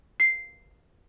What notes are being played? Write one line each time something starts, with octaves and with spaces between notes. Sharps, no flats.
C7